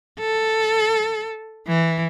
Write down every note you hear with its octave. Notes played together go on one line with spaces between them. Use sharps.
A4
E3